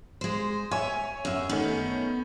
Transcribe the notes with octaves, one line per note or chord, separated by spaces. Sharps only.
G#3 C5
C#5 E5 G#5
F#2 E5
D#3 A3 B3 C#4